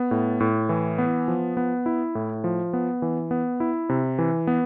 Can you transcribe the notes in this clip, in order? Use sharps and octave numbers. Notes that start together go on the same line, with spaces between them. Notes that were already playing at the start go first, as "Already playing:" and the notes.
Already playing: B3
A2
A2
E3
B3
F3
B3
E4
A2
F3
B3
E3
B3
E4
C3
E3
B3